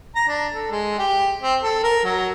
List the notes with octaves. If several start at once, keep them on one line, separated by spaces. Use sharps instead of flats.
A#5
D4
A4
G#3
G4
C4
A4
A#4
F#3